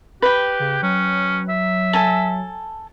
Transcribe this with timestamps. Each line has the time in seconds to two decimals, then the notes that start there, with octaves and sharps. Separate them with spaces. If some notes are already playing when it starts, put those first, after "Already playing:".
0.22 G4 B4 G5
0.59 C#3
0.82 F#3 C#4
1.49 E5
1.93 A4 G#5 A5